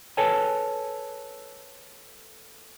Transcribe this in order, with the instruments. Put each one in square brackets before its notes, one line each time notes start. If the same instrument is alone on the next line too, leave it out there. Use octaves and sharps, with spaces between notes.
[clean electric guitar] G#4 A4 B4 C#5 G#5 A5